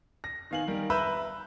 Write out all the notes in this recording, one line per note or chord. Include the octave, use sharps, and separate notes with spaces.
A#6
D#3 B3 F5 G#5 F#7
D#3 G3 A#4
B4 E5 A#5 B5 E6 G6